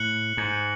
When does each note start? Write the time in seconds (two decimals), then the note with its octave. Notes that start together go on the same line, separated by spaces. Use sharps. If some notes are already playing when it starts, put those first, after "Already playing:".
Already playing: A2 F#6 C#7 F#7
0.37 G#2